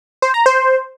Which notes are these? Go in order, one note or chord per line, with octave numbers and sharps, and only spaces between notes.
C5
A#5
C5